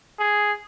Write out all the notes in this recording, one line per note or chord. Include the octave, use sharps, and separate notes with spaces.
G#4